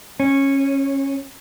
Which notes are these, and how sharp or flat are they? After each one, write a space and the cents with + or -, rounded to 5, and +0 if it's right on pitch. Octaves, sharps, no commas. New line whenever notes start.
C#4 -15